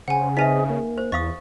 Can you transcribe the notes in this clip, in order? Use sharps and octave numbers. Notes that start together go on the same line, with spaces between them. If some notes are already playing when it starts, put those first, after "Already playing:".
C#3 C5 F#5 G#5
C4 D#4 G#4 B4 D#5 E5 G#5 B6
A#3
C5
E2 D#5 F5 C#6 D#6